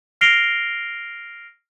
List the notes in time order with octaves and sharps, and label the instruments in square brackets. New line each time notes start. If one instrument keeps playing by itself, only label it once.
[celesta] F6 A#6 C7 D7 F7 G7